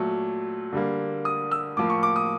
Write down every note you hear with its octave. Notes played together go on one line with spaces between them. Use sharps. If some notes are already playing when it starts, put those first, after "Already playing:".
Already playing: A#2 F#3 A3
D3 G3 A#3
D#6
E6
A2 F3 A#3 D6
C#6
D6
D#6